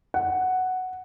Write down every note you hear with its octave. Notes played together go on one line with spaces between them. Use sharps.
F#5